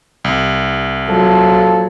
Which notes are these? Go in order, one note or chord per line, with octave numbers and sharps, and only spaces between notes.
C2
A#1 F3 F#3 A4